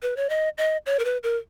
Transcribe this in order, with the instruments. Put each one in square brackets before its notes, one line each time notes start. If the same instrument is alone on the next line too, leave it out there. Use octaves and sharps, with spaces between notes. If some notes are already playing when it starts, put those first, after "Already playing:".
[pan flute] B4
C#5
D#5
D#5
C#5
A#4
B4
A#4